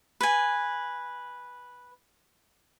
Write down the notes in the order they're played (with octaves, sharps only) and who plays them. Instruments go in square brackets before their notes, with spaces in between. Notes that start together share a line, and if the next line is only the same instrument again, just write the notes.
[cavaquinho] B4 G#5